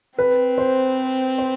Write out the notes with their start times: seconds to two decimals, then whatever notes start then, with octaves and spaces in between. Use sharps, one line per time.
0.18 C4 B4
0.58 C5
1.38 C5